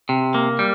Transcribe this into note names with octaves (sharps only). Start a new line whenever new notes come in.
C3
A#3
G3